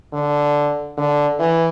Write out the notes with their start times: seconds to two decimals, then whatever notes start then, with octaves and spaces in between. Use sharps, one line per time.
0.14 D3
0.98 D3
1.40 E3